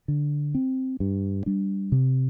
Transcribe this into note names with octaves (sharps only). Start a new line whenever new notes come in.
D3
C4
G2
G3 D4
C3